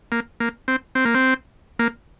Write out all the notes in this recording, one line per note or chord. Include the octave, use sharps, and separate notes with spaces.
A#3
A#3
C4
C4
A#3
C4
A#3